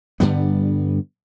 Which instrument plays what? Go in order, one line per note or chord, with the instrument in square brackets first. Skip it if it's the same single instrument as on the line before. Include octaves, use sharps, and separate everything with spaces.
[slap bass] G2 D3 G3 B3